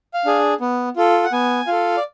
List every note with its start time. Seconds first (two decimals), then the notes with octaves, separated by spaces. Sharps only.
0.14 F5
0.25 D4 G#4
0.61 B3
0.96 F4 A4
1.24 F#5
1.32 B3 G#5
1.67 F4 A4 F5
1.97 D5